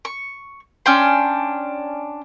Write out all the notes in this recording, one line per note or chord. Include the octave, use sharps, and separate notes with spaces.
C#6
C#4 D4 G5 C6